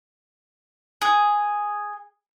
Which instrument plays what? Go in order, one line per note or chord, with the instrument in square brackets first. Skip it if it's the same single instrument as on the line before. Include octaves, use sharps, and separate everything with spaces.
[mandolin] G#4